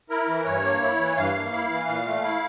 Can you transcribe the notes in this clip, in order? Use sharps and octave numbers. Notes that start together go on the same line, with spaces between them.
E4 A#4
E3
G2 C#5
A#3
E4
E3
G2 F5
A#3
E4
E3
A#2
A3
E4